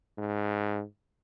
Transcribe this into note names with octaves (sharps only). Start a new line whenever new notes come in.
G#2